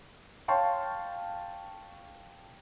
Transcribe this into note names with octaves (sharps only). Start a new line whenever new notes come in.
C#5 F5 G5 A5 C6 C#6